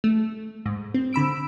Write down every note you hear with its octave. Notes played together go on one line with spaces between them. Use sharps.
A3
G#2
C4
D3 B5 E6 D7